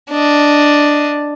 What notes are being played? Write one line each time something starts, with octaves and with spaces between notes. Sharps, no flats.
D4 D#5